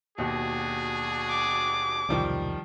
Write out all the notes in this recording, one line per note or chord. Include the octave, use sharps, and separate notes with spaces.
D#2 B2 D4 F#4 G#4
D6
E1 C2 D#3 F3 G3